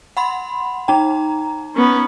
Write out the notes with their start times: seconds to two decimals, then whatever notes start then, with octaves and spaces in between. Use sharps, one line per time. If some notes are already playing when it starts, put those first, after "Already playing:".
0.17 F#5 B5 C6
0.88 D#4 G5 A#5
1.75 B3 C#4